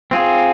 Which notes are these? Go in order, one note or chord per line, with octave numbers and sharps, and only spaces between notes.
C4 F4 G#4